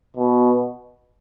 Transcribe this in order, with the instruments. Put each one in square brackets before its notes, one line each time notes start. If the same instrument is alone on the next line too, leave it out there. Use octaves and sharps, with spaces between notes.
[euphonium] B2